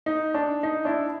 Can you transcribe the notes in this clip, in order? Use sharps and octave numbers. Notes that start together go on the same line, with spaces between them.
D#4
D4
D#4
D4 E4